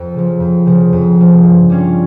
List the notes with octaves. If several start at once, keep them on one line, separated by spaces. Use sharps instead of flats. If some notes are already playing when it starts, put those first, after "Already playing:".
Already playing: F2
C#3 F3
F2
C#3 F3
F2
C#3 F3
G2
G3 C#4 F4